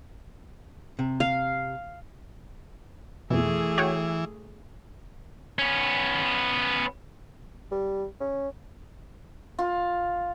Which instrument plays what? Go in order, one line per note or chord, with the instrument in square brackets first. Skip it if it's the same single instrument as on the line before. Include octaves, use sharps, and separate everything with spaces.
[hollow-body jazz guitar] C3
[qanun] F5
[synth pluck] F2 B2 [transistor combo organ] E3 [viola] A3 G#4
[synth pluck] F#4 C#5 G5
[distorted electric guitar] B3 C#4
[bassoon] G3
C#4
[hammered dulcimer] F4